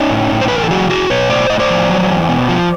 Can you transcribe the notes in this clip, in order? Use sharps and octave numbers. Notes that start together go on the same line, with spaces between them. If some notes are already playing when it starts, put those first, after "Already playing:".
Already playing: C#4 D#4
A2
A2
C5
B4
E3 A#4
A4
F#3 F#4 G#4
E2 F#4 G#4
B2 B4 C#5
A2 C5 D5
A2 D#5
C5 D5
F3
F#3
E2
B2
F3